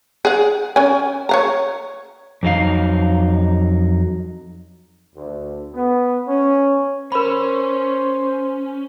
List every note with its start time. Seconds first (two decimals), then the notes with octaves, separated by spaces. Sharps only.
0.25 G#4 F#5
0.76 C#4 G#5
1.29 C#5 F5 A#5
2.43 F2 F#3 D#4 F5
5.16 D2
5.75 B3
6.27 C#4
7.12 C#4 A#4 C5 B5